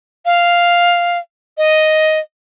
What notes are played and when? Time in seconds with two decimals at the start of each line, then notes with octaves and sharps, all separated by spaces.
0.26 F5
1.58 D#5